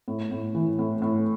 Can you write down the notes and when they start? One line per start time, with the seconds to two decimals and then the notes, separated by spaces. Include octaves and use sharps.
0.08 A2
0.31 A2
0.55 E3
0.79 A2
1.02 A2